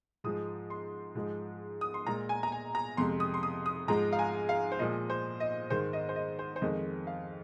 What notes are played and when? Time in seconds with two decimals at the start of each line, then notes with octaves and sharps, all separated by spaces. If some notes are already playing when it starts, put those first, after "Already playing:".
0.24 G#2 F3 G#3 D#6
0.70 C6
1.15 G#2 F3 G#3
1.81 D#6
1.94 C6
2.07 A#2 G#3 A#5
2.29 G#5
2.43 A#5
2.52 G#5
2.75 A#5
2.97 F2 C3 G#3 C6
3.20 D#6
3.34 C6
3.43 D#6
3.66 D#6
3.88 G#2 F3 G#3 A#5
4.13 F5
4.19 G#5
4.49 F5
4.72 C5
4.79 A#2 F3 G#3 D#5
5.10 C5
5.40 D#5
5.70 G#2 D#3 G#3 C5
5.93 D#5
6.09 C5
6.16 D#5
6.39 C5
6.56 C5
6.62 F2 D#3 G#3 D#5
7.07 F5